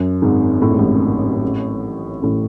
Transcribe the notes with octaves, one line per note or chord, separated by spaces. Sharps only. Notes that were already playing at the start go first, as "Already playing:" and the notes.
Already playing: F#2
G#1 G#2
A2
G#2
A1 A2
A1 A2